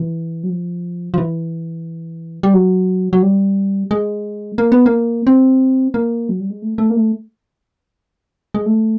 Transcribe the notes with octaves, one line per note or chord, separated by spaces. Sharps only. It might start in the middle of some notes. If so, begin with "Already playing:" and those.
Already playing: E3
F#3
F3
F3
E3
G3
F#3
F#3
G3
G#3
A#3
B3
A#3
C4
A#3
F#3
G3
G#3
A3
A3
A#3
A3
G#3
A3